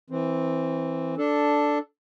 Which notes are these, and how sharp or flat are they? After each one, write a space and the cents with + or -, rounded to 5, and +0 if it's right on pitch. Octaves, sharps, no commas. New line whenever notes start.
E3 -15 C4 +0
D4 +0 A4 +0